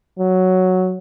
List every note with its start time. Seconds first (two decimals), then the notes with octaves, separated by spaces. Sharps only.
0.19 F#3